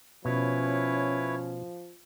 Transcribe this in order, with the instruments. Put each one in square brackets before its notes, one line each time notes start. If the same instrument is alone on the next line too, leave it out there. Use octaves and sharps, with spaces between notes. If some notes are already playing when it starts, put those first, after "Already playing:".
[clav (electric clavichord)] B2 [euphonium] F3 [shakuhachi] C#4 [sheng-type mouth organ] E4 B4 C#5